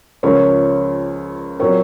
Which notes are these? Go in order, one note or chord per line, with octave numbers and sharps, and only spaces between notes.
C#2 C#3 F3 A#4 C#5
A#2 F#3 C4 A#4 C#5